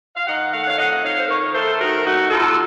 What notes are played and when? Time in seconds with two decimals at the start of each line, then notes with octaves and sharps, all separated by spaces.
0.16 F5
0.27 D#3 D#5 F#5
0.52 A3 F5
0.60 F#5
0.68 C#5 F5
0.78 F2 D#5 F#5
0.91 F#5
1.04 D#4 C#5 F5
1.19 C5
1.28 D#3 A#4 C#5
1.54 A3 A4 C5
1.72 A4
1.79 D#3 F#4 A#4
2.05 A3 D#4 F#4
2.30 D#2 F4 A4